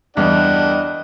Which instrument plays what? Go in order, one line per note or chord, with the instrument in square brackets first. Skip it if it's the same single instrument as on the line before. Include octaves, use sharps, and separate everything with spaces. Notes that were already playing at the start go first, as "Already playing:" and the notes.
[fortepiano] E2 G2 [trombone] D4 [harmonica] D#5 G5 [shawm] F#5